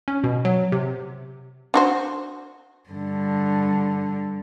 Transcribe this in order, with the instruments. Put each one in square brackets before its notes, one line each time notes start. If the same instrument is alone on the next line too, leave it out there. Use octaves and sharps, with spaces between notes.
[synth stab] C#4
B2
F#3
C3
[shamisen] D4 F#4 C5
[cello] G2 D3